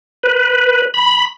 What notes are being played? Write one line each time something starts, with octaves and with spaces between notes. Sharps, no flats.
B4
B5